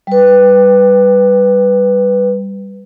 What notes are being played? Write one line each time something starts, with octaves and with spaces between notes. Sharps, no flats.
G3 B4